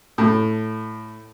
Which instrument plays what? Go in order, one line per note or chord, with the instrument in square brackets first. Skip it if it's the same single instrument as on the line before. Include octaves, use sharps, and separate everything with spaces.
[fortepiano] A2